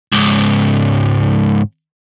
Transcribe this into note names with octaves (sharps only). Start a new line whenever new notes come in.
C#2 G#2